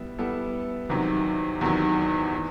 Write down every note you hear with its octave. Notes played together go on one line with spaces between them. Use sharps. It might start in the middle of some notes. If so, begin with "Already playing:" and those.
Already playing: G3 B3 E4 E5
G3 B3 E4 A4 E5
E2 C3 D#3 F#3
E2 C3 D#3 F#3
E3